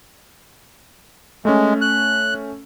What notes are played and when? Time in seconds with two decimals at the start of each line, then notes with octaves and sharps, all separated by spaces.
1.45 G#3 A3 C#4
1.81 F#6